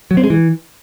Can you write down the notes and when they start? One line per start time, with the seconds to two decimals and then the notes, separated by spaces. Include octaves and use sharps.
0.11 F#3
0.17 C4
0.24 G#3
0.30 E3